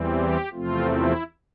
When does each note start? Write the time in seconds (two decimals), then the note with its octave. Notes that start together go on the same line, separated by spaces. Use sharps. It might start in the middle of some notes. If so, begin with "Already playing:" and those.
Already playing: E2 E3 G3 C4
0.15 G4
0.53 E2 C3 F3 A3 C4 F4
0.90 E4